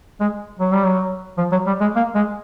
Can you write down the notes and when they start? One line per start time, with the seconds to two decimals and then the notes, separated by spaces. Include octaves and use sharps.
0.20 G#3
0.60 F#3
0.73 G3
0.85 F#3
1.38 F3
1.52 F#3
1.67 G3
1.81 G#3
1.96 A#3
2.15 G#3